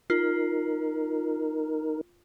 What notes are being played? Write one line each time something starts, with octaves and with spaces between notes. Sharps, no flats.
D#4 F4 A#4